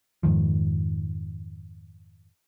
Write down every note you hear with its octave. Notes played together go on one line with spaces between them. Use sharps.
F2 G#2 D#3 F3